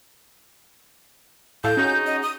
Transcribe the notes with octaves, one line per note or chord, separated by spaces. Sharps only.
A2 A4 F5 G6
C#4 D#4 F#4 G#4
D#5
D#6